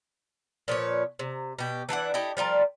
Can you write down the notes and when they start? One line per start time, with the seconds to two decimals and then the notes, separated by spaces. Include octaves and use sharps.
0.68 A#2 F3 B4 C#5
1.19 C3
1.59 B2 G4
1.89 E3 D4 E4 F#5
2.14 E4 G4 A4 D#5
2.37 F3 G3 F4 A#4